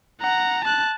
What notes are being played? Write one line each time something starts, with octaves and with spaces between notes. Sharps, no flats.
F#5 A#5
A5 F#6